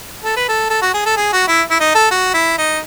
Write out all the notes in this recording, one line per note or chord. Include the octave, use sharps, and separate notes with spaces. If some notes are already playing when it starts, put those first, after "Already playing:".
A4
B4
A4
A4
F#4
G#4
A4
G#4
F#4
E4
E4
D#4
A4
F#4
E4
D#4